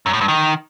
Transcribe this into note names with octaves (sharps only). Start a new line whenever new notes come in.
F#2
A2
G2
D#3